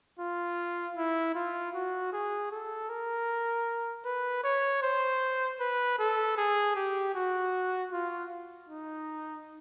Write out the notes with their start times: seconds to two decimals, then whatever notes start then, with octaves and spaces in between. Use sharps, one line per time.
0.19 F4
0.97 E4
1.35 F4
1.75 F#4
2.13 G#4
2.51 A4
2.89 A#4
4.05 B4
4.44 C#5
4.82 C5
5.60 B4
5.99 A4
6.37 G#4
6.76 G4
7.15 F#4
7.92 F4
8.69 D#4